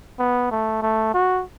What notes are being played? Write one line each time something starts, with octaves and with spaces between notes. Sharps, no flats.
B3
A3
A3
F#4